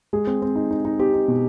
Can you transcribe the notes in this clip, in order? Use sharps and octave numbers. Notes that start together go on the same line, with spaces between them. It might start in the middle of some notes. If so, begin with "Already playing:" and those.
G#3 G#4
C4
C4
D#4
D#4
D#4
C4 G4
D#4
B2